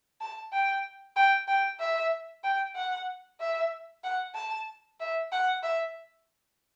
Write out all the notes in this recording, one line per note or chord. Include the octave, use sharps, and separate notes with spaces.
A5
G5
G5
G5
E5
G5
F#5
E5
F#5
A5
E5
F#5
E5